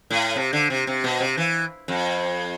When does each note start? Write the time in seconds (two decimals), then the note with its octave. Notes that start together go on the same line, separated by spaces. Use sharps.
0.10 A2
0.36 C3
0.53 D3
0.70 C3
0.87 C3
1.04 B2
1.20 C3
1.37 E3
1.88 F2